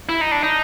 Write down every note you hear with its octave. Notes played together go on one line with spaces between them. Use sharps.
E4
D#4
D4
D#4